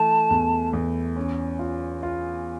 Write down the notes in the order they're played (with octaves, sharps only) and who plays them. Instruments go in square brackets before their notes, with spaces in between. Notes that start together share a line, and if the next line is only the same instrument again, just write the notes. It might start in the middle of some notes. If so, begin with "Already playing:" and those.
Already playing: [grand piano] E3 A3 [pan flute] A5
[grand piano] E2
E2
C#4
F4
F4